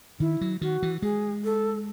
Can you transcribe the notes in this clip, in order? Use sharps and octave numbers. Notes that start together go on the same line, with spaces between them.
D#3 E4
F#3
D#3 F#4
E3
G#3 G#4
A4